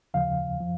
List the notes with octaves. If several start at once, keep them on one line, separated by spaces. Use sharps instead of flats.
D#2 C#3 F3 F5
F3